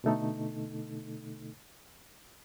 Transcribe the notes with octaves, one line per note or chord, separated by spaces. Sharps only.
B2 D3 A3 D#4 A4